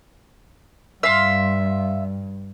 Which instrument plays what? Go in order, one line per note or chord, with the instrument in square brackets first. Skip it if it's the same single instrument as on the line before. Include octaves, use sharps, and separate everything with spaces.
[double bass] G2 [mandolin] E5 F5 C6